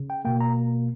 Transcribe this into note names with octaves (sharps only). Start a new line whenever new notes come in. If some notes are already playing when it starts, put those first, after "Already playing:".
Already playing: C#3
G5
B2 A#3 G5
A#5